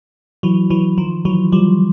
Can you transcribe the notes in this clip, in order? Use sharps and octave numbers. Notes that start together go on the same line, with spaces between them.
E3 F#3
E3 F#3
D#3 F3
E3 F#3
F3 G3